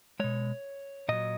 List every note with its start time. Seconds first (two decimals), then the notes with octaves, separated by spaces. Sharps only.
0.20 B2 G#3 C#5
1.09 A#2 F#3 D#5